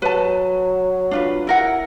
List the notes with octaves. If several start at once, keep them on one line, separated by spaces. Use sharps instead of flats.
F#3 B4 A5
D4 F4 B4
E4 A#4 F#5